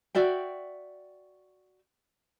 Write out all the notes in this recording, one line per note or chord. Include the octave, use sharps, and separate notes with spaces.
F#4 D5 E5 G5